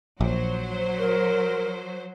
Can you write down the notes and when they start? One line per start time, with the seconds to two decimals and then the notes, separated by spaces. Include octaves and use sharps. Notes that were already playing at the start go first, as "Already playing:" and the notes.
0.21 A#1 F#3 C5
0.99 A#4